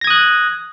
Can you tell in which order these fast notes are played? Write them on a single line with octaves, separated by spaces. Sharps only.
A#6 G#6 D#6 F#6